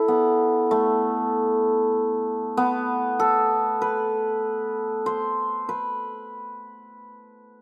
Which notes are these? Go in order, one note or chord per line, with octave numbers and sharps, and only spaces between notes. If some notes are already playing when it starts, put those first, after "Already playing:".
Already playing: E4 A4
B3
A3
B3
A4
B4
C5
B4